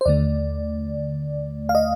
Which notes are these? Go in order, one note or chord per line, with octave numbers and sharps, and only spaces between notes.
C5
D#2 D3 A3 D5
F5
D#5